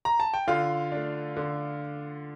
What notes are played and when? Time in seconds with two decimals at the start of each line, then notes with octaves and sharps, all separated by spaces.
0.05 A#5
0.20 A5
0.34 G5
0.47 D3 F4 F5
0.92 A3 D4
1.37 D3